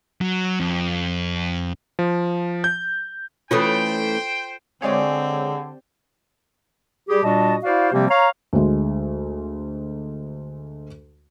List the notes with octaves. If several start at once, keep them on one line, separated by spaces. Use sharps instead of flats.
F#3
F2
F3
G6
E3 A3 C#4 F4 A4 C5 G5
D3 G#3 C4 G4 G#4 C#5 D5 F5
G3 G4 G#4
A#2 G3 D4 F#4 D#5 A5
E4 F#4 C5 D5 F5
C3 F3 G3 A#3 C4 G4
C#5 F5 A#5
D2 G#3